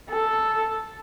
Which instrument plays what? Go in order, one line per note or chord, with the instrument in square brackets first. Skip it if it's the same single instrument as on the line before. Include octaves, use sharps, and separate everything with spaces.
[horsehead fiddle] A4